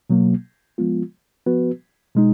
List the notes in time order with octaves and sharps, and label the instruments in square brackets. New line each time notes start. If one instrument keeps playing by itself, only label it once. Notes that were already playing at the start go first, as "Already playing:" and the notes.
[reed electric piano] B2 F#3 A#3
F3 G#3 B3 F4
F3 B3 F#4 B4
B2 G#3 D#4